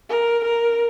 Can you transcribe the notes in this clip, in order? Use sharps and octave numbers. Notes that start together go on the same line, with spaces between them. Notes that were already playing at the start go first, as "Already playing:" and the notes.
A#4
A#4